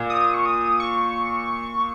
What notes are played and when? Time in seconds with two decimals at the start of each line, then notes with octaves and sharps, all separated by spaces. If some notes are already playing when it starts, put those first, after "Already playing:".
Already playing: A#2
0.10 D#6
0.34 C#6
0.46 D#6
0.80 C#6